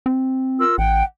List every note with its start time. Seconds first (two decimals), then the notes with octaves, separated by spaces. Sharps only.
0.06 C4
0.60 F4 A#4 E6
0.78 A1 F#5 G5